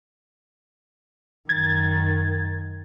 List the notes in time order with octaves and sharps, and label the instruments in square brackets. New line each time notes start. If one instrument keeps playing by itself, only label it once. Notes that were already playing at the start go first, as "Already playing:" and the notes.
[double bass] F#2 D#3 [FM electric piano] G#6 A6